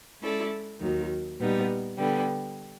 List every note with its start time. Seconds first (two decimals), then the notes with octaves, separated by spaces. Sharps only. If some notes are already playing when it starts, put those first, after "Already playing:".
0.21 G#3 C#4 E4 A4 D5
0.80 D#2 D#3 F#3
1.39 A#2 G3 B3 D#4
1.98 D3 G3 B3